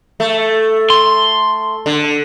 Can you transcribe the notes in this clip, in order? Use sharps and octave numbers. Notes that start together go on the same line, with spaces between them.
A3
C6
D3